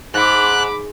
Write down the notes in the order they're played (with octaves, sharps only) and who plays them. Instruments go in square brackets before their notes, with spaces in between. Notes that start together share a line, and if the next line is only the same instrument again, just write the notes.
[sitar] G#2 [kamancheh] B5 D6 [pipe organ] F#6